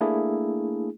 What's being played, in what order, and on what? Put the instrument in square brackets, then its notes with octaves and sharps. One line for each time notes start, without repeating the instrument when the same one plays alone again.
[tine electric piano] A3 A#3 D4 E4 G#4